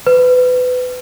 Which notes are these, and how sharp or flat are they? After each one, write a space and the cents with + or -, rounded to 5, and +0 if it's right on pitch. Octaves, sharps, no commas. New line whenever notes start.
B4 +25